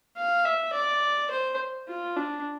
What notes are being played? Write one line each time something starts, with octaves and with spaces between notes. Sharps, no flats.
F5
E5
D5
C5
F4
D4